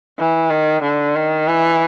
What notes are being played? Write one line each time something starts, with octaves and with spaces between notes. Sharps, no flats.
E3
D#3
D3
D#3
E3